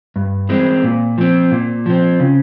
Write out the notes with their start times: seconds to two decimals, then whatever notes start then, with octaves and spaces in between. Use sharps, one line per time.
0.16 G2
0.49 E3 G#3 C4
0.84 A#2
1.18 F3 C4
1.52 A#2
1.86 F3 C4
2.20 C#3